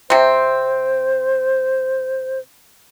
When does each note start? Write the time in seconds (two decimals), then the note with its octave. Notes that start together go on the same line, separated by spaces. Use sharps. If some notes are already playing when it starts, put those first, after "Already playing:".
0.10 C3 C4 C5